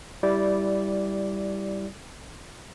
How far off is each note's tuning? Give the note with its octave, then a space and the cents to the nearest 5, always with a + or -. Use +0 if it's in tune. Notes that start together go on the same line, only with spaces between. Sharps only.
G3 +0 E4 +0 D5 -10